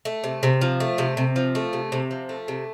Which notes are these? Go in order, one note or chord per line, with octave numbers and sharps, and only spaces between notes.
A3
C3
C3
F3
A3
C3
C3
F3
A3
C3
C3
F3
A3
C3